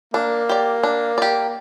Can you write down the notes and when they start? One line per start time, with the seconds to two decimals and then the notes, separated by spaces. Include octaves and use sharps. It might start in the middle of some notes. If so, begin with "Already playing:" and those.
0.14 A#3 D4
0.49 G4 D5
0.83 D4
1.18 G4 D5